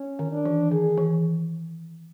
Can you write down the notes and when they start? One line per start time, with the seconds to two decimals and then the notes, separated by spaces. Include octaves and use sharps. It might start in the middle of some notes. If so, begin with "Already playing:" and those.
Already playing: C#4
0.19 D#3
0.32 D4
0.46 E3
0.71 D#3 G#4
0.98 E3